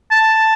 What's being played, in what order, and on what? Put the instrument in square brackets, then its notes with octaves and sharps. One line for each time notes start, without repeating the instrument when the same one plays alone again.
[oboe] A5